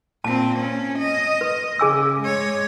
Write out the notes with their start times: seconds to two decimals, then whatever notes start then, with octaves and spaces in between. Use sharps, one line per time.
0.24 A#2 C4 A5
0.59 C#4
0.99 D#5
1.41 B4
1.79 C#3 G#4 G#5 E6
2.21 G#3 C#5